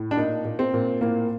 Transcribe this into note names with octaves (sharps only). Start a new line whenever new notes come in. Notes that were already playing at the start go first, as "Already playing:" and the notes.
Already playing: A2
D4
A#2 D#4
A#2
C4
A#2
A2 A#3